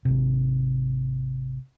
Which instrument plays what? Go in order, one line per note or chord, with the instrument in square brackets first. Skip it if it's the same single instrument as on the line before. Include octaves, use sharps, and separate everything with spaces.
[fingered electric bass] G#1 C3